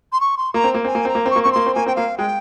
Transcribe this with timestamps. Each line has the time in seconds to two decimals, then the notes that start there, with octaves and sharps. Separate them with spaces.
0.13 C6
0.21 C#6
0.38 C6
0.54 A#3 A#5
0.64 C4
0.74 A#3
0.85 C4 G#5
0.95 A#3
1.05 C4 A#5
1.15 A#3
1.26 C4 C#6
1.36 A#3
1.43 C4 C#6
1.52 A#3 C6
1.66 C4
1.74 A#3 G#5
1.86 C4 G5
1.96 A#3 F5
2.18 G#3 G5